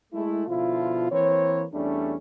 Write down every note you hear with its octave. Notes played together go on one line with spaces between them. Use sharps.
G#3 A3 E4
B2 D3 F3 E4 F4
E3 A#3 C4 B4 C#5
E2 G3 A3 C#4 D4